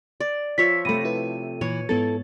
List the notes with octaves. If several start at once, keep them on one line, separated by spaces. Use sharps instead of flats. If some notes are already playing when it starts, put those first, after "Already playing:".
D5
F3 C#5 E5 B6
C3 A3 B5 A#6 D#7
E4 A4 B4
A#2 E3 C#5
G#2 B3 E4 A4 A6